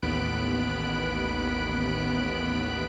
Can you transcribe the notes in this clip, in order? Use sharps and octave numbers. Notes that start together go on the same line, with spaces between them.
A1 D#2 B3 B5 F#6 D7